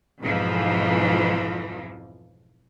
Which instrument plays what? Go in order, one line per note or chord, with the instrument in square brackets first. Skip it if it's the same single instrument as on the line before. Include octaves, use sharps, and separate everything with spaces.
[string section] B1 F2 G#2 E3 F3